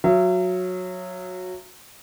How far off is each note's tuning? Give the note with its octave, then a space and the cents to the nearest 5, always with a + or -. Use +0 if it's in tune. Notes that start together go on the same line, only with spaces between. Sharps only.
F#3 -15 E5 +40